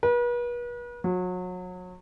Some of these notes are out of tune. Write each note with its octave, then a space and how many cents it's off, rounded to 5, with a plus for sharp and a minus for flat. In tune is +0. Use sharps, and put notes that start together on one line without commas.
B4 -40
F#3 -30